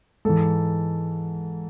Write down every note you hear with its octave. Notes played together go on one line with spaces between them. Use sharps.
G#2 E3 A4